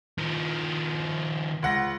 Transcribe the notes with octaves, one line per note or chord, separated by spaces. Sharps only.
D#3 F3
C#2 F#5 A#6